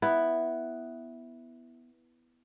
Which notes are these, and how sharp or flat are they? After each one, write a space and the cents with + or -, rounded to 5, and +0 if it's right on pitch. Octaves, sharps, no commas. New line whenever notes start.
B3 +0 E4 +0